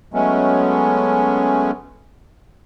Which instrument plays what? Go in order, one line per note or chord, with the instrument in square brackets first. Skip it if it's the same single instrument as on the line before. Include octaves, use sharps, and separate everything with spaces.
[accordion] F#3 G#3 A3 B3 C#4